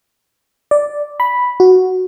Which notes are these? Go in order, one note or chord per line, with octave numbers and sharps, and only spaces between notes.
D5
B5
F#4